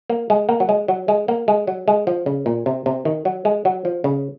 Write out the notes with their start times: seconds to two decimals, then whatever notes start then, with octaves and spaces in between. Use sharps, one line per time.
0.10 A#3
0.30 G#3
0.49 A#3
0.60 F#3
0.69 G#3
0.88 F#3
1.08 G#3
1.28 A#3
1.48 G#3
1.67 F#3
1.88 G#3
2.07 F3
2.26 C#3
2.46 A#2
2.66 C3
2.86 C3
3.05 D#3
3.25 F#3
3.45 G#3
3.65 F#3
3.85 F3
4.04 C#3